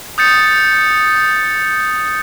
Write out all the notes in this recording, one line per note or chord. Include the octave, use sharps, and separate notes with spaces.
D#6 G6 A6 C#7